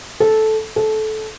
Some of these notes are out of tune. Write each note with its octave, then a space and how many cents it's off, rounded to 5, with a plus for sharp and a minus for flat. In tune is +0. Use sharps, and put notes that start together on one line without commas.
A4 -10
A4 -20